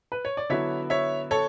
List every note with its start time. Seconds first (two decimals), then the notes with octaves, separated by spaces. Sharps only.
0.12 B4
0.25 C#5
0.37 D5
0.49 D3 F#3 B3 E4 C#5 E5
0.90 C#5 E5
1.31 A4 C#5